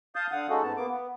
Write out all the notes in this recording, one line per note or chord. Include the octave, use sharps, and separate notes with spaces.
F5 A5 D#6 G6
D3 F5 F#5 D#6
G#3 C#4 D#4 F#4 A4
G#2 B3 A5
A#3 B3 D6
B3